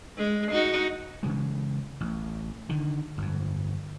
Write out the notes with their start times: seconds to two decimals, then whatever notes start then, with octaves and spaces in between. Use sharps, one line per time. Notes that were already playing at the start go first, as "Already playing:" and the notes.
0.18 G#3
0.52 D#4 F#4
1.23 C#3 E3 G#3
2.01 A1
2.69 D3 D#3
3.18 G1 F2